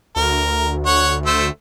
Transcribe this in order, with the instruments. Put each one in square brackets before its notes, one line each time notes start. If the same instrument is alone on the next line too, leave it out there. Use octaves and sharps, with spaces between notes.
[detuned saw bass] D2 [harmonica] A#4
[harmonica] C#5 F#5
A3 C5 E6